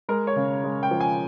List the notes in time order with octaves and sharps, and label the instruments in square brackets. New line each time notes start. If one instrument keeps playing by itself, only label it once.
[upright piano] G#3 A#4
C#5
C#3
G#3
G5
F3
G#5